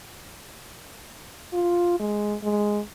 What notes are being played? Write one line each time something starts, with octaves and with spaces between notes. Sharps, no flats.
F4
G#3
G#3